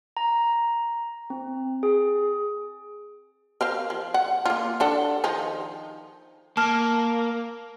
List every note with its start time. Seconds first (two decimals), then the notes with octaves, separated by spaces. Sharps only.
0.17 A#5
1.30 C4
1.83 G#4
3.61 A#4 C5 F5
3.90 F3
4.14 F#5
4.45 A#3 F4
4.80 D4 A4 F#5
5.24 D#3 F3 D#4
6.57 A#3 A5 F6